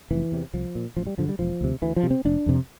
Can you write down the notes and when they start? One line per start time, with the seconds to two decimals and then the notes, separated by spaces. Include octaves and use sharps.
0.11 F1 E3
0.32 E2 C3
0.53 C2 F3
0.75 A#2
0.96 A1 F3
1.07 G3
1.18 G2 D3 F3
1.29 G3
1.39 E1 F3
1.61 D2 C3
1.82 D2 E3
1.96 F3
2.03 C3
2.10 C4
2.25 F1 D4
2.46 F2 C3